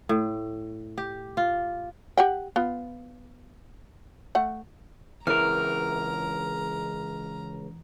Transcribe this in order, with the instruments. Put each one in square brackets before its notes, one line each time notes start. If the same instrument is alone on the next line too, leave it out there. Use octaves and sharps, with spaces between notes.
[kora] A2
G4
F4
[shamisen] G4 F#5 G5
B3 F4
A3 F#5
[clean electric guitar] C#2 A#4 [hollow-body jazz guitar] E3 [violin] A#5 [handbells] F6